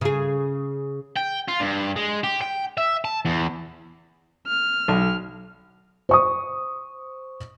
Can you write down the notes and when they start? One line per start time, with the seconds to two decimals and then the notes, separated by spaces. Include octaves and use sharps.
0.01 C#3 G#4
1.16 G5
1.48 F4
1.60 G2
1.96 G#3
2.24 G4
2.42 G5
2.78 E5
3.05 A5
3.25 E2
4.47 F6
4.88 B1
6.09 C5 C#6 D#6